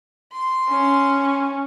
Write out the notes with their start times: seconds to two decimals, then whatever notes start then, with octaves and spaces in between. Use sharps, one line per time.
0.32 C6
0.70 C#4